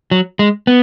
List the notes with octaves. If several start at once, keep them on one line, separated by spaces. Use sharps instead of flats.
F#3
G#3
B3